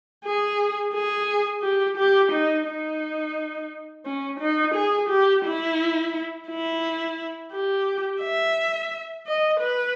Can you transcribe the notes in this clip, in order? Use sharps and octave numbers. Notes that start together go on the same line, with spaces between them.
G#4
G#4
G4
G4
D#4
D#4
C#4
D#4
G#4
G4
E4
E4
G4
E5
D#5
B4